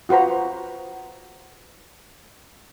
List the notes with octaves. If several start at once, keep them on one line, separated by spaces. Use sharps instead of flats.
F4 F#4 B4 C5 A#5